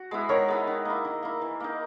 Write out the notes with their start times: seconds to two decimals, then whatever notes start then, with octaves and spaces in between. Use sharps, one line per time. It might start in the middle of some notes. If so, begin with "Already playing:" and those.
Already playing: F#4
0.11 G#3 B3 E4
0.29 D#3 A#4 C#5
0.48 G#3 B3 E4
0.67 D#3
0.85 A#3 E4
1.05 D#3
1.22 A#3 E4
1.41 E3
1.60 A#3 D#4